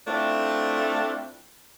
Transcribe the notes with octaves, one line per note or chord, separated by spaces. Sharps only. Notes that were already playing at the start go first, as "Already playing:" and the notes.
A3 C4 D4 E4 F4